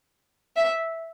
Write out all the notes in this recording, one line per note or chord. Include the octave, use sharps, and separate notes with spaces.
E5